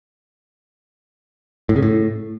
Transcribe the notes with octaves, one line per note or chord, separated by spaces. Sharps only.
A2
C#3
A2